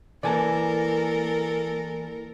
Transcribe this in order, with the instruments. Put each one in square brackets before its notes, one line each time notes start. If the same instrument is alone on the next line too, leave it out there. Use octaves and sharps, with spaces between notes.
[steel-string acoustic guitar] E3 [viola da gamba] A#3 A4 A#4 [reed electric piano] D5 G#5 A5